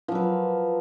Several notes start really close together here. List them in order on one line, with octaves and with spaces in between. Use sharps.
F3 F#3 B4